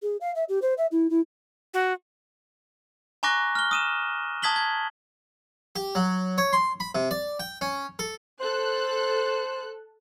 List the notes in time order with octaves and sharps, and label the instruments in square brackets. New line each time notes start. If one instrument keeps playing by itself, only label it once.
[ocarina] G#4
F5
E5
G4
C5
E5
E4
E4
[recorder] F#4
[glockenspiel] G#5 A#5 C#6 D6 F#6 A#6
F6 G7
D#6 D#7 E7
A5 D#6 G#6 B6 F#7 G7
G#6
[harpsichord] G4
F#3
C#5
C6
B5
C3
D5
G5
C#4
A4
[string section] A4 F#6 [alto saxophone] C5